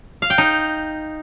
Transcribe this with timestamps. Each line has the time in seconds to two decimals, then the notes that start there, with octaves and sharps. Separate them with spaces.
0.22 F5
0.30 G5
0.38 D#4